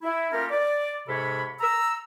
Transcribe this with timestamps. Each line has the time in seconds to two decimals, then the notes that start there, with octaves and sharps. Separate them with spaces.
0.03 E4
0.32 A#3 C#4 F4 G4 A4 A#4
0.50 D5
1.08 G#2 C3 A4 C#5 B5
1.61 A#5 E6